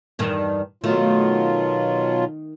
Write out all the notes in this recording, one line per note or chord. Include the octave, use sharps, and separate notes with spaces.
E2 G2 D#3
B2 D#3 F#3 A3 F4